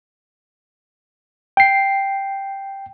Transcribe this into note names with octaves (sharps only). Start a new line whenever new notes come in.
G5 C7